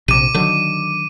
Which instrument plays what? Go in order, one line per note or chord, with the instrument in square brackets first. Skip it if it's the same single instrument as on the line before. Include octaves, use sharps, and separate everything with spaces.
[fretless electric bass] A#1 C3 [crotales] D6 D#7
[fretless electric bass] D3 D#3 F#3